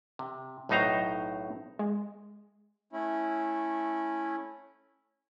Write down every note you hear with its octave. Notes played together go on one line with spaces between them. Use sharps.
C3
B1 A2 F#3 D#4 C5 A#5
G#3
A3 C#4 E4